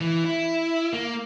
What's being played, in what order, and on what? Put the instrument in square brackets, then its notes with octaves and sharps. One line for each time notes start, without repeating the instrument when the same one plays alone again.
[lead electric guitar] E3
E4
A#3